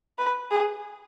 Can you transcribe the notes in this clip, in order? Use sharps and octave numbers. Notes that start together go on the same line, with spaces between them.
B4
G#4